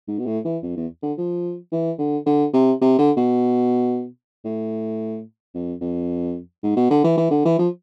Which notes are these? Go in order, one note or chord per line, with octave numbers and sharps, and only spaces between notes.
G#2
B2
A2
E3
F2
E2
D3
F3
E3
D3
D3
C3
C3
D3
B2
A2
F2
F2
G#2
B2
D3
E3
E3
D3
E3
F3